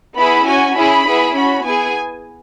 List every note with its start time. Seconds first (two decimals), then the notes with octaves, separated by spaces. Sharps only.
0.16 B3 E4 G#4 B5
0.46 C#4 F#4 G#5
0.75 C#4 E4 G#4 B5
1.06 B3 E4 G#4
1.34 C#4 F#4 B5
1.64 B3 E4 G#4 G#5